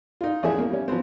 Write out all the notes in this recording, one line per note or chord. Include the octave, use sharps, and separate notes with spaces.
D#4 F4
A1 F2 C#4 G#4 E5
A#3
G3 C#4
F3 F#3 B3 C4